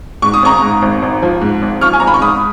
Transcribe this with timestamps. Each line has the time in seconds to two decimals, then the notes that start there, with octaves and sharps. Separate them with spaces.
0.22 G#2 C#6
0.34 D#6
0.43 G#1 A#5 C#6
0.62 G#2
0.82 G#1
1.02 G#1
1.22 F3
1.41 G#2
1.62 G#1
1.81 F3 C#6 F6
1.93 G#5
2.00 G#1 A#5
2.07 B5
2.14 C#6
2.21 G#2 B5 D#6